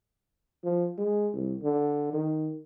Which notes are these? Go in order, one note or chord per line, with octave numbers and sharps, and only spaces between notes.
F3
G#3
C2
D3
D#3